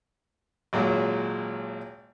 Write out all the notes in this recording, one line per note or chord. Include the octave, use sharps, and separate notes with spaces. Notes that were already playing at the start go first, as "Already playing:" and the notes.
G#1 A#2 F#3 G#3 C#5